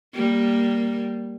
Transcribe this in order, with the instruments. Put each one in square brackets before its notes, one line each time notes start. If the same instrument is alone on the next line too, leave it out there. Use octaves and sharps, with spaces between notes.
[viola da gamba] G3 A#3